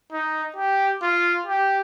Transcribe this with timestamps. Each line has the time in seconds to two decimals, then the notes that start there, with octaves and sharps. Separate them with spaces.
0.12 D#4
0.56 G4
1.02 F4
1.47 G4